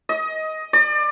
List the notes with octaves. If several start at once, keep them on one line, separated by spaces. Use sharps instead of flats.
D#5
D5